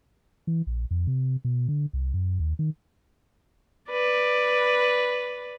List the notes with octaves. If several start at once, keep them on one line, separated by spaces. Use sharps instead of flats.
E3
A#1
F2
C3
B2
D3
C2
F#2
D#2
D#3
B4 D5